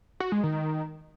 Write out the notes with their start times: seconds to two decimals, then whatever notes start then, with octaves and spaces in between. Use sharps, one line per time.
0.20 F#4
0.32 G#3
0.43 D#3